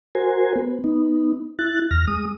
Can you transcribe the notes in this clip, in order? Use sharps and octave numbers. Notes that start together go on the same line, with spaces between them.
F#4 A#4 C5 G#5
B3
B3 D#4
E4 F#6 A6
E2 F6 A#6
G#3 D#6